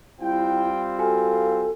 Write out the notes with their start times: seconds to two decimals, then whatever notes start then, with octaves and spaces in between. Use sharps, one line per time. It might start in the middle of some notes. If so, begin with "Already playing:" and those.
0.21 G3 C4 E4 F4 G5
0.99 F#4 A4 F5 G#5